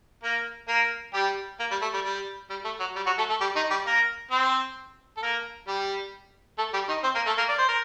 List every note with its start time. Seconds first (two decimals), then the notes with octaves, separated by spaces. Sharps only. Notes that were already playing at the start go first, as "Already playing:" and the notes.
0.23 A#3 A#4
0.68 A#3 A#4
1.13 G3 G4
1.60 A#3
1.71 G3
1.82 A3
1.94 G3
2.05 G3
2.50 G3
2.65 A3
2.80 F#3
2.96 G3
3.06 F#3 F#4
3.18 A3 A4
3.29 A3 A4
3.40 G3 G4
3.56 D#3 D#4
3.71 G3 G4
3.86 A#3 A#4
4.31 C4 C5
5.17 A4
5.22 A#3 A#4
5.67 G3 G4
6.58 A3 A4
6.73 G3 G4
6.88 D#3 D#4
7.03 C4 C5
7.15 A#3 A#4
7.26 A3 A4
7.38 A#3 A#4
7.49 D5
7.59 C5
7.68 A#4